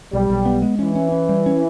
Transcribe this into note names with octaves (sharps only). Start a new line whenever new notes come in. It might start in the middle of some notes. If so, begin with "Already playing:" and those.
B1 G3
B1
B3
G#3
E3 C#4
C#4
C#4
G3
C#4